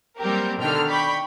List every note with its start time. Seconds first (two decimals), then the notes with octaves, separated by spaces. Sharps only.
0.20 F#3 G3 A#3 C4 G4 A#4
0.60 B2 D3 D#3 G5 F6
0.88 D5 G5 B5 C#6